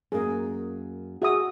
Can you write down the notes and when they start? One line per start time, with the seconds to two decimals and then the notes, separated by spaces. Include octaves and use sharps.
0.12 F#2 A#3 G#4
1.22 F#4 G#4 E5 D#6